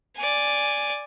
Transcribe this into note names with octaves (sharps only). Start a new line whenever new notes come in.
D5 G#5